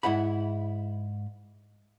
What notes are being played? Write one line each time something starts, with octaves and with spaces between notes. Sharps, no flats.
G#2 E4 F#5 B5